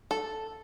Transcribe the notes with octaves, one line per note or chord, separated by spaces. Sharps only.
A4